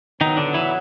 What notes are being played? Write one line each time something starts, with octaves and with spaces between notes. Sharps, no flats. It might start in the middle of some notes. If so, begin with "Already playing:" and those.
A2 D#3 F#3 B3 D#4
D3 D4
E3 E4